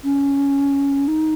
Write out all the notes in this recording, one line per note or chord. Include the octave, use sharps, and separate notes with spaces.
C#4
D#4